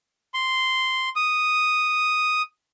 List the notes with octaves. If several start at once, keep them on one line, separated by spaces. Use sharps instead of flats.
C6
D#6